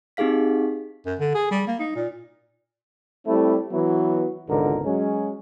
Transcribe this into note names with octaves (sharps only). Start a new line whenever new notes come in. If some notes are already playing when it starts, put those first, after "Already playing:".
C4 D#4 G4 G#4 F5 B6
F#2
D3
G#4
G3
A#3
D#4
A#2
G3 A3 C4 E4
E3 F#3 B3 E4 F#4
G#1 C#2 G#2 B2 D3 A#4
F#3 G#3 C#4